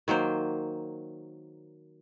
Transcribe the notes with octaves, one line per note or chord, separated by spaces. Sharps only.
D#3 F#3 A#3 C5